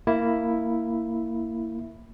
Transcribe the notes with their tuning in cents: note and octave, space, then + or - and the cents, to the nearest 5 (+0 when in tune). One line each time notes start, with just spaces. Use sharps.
A#3 -15 E4 +0